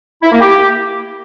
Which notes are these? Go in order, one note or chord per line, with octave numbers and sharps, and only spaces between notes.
E4
A#3
G4